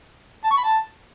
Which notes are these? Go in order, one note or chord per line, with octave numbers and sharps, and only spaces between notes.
A5
C#6
B5
A5